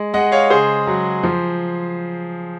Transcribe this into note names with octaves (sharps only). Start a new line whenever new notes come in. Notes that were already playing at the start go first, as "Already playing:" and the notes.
Already playing: G#3
G#3 D#5 F#5
C#5 F5
C#3 G#4 C5
F#3
F3